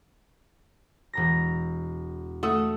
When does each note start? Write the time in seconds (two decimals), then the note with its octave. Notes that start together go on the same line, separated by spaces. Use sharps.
1.13 E1 A#5 A#6
2.43 A3 F#5 D#6 E6